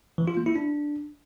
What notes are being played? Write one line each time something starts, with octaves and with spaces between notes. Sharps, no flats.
E3
F4
A#3
E4
D4